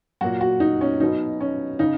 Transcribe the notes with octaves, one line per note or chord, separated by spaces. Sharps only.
A#2 F#3 F#4
F#4
D#4
C#4
B2 F#3 D#4
C#4
C#3 D#4